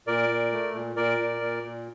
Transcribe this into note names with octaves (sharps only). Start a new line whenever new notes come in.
A#2 A#4 D5
A#2
A3
A#2
A#2 A#4 D5
A#2
A#2
A#2